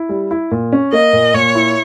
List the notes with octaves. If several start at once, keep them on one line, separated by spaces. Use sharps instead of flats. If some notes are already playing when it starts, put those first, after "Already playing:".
Already playing: E4
G3
E4
A#2
C#4
A#3 D#5
A#2
A#2 C#5
E4